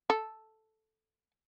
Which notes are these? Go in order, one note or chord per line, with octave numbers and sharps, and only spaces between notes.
A4